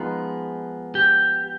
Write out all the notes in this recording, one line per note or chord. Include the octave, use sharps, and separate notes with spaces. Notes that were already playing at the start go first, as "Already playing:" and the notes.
Already playing: F3 G#3 B3 D#4 G#4
G4